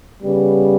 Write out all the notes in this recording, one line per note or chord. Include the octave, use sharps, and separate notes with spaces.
C#3 G3 B3